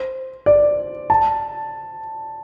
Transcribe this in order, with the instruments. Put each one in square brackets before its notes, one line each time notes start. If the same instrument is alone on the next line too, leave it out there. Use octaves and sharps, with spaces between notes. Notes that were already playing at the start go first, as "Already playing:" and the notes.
Already playing: [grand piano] C5
D5
A5